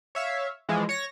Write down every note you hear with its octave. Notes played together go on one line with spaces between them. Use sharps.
C#5 E5 F5
E3 F3 G#3
C#5 A#6